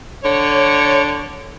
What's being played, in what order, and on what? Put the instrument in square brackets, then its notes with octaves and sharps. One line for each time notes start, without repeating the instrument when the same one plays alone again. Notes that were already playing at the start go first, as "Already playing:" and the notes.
[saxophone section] D3 C#5